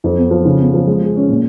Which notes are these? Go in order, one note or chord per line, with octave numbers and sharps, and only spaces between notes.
F2
B3
F3
C#3
B3
F3
G#3
G#4
C#4
A#2